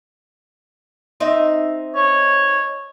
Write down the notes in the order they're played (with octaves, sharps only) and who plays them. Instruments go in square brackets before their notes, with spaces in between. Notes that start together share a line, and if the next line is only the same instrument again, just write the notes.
[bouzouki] C4 D#4 E5
[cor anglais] C#5